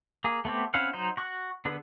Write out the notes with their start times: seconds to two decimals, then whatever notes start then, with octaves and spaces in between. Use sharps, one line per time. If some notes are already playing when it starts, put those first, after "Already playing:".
0.24 A#3 G#4
0.45 A3 B3 C4 G4
0.74 C4 C#4 E4 F5 F#5
0.93 F#3 D#4 C5
1.17 F#4 C#6 F#6
1.65 D3 B3 G#4 B4